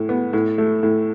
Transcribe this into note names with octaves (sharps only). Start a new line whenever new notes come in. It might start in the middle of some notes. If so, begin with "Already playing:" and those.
Already playing: A2
B3
A2
A3
A2